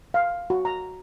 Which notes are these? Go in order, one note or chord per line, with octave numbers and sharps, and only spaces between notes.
F5
F#4
A#5